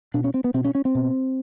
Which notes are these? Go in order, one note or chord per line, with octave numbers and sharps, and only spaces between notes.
B2 D4
C#4
C4
B3
B2 C4
C#4
C#4
C4
B2